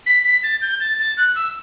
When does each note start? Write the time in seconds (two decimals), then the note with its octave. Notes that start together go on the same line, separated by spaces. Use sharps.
0.06 B6
0.25 B6
0.43 A6
0.62 G6
0.81 A6
0.99 A6
1.18 F#6
1.36 E6